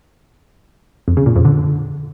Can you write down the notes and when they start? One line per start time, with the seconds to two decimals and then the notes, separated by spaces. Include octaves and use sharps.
1.08 F2
1.17 C#3
1.26 A#2
1.36 F2
1.45 D3